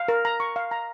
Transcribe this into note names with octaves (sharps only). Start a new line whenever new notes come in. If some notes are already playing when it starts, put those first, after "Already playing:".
Already playing: F5
A#4
A#5
C#6
F5
A#5